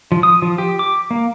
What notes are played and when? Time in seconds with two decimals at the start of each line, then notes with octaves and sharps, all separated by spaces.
0.12 F3
0.23 D#6
0.42 F3
0.58 G4
0.79 D6
1.11 A#3